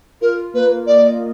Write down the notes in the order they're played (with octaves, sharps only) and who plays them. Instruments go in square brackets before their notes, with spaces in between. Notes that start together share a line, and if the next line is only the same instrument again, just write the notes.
[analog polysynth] F4 [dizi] A#4
[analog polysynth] A#3 [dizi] B4
[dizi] D5 [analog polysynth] D#5